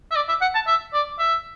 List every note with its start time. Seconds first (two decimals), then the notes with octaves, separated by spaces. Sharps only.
0.11 E5
0.16 D5
0.29 E5
0.41 F#5
0.55 A5
0.67 E5
0.94 D5
1.19 E5